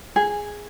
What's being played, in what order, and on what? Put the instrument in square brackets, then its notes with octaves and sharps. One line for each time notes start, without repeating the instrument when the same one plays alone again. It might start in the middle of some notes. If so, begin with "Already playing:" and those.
[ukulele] G#4